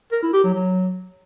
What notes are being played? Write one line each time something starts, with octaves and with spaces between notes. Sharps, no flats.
A#4
E4
G4
F#3
F#3